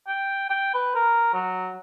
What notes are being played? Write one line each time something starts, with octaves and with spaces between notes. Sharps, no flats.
G5
G5
B4
A#4
F#3